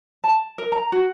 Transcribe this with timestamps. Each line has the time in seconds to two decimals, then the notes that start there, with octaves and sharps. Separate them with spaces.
0.24 A5
0.58 A#4
0.72 A#5
0.92 F#4